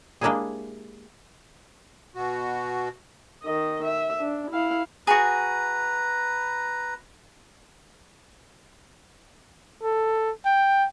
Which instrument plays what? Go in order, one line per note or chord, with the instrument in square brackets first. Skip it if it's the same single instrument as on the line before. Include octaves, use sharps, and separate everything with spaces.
[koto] G#3 A#3 D4 E4 G4 G#4
[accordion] B2 F#4
[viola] D#3 D#5
E5
D4
E4 F5
[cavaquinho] F#4 G#4 [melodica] B4 A#5
[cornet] A4
G5